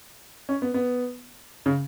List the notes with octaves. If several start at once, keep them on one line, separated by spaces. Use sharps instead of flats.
C#4
B3
B3
C#3